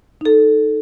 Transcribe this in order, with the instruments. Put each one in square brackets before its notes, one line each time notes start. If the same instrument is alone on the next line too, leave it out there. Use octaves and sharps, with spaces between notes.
[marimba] D#4 A4